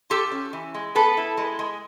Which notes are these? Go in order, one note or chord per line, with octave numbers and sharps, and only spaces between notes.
F4 G4 A4
C#4
E3
G#3
B3 A4 B4
E4
G#3
G#3